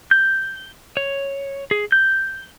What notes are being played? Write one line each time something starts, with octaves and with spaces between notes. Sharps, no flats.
G6
C#5
G#4
G6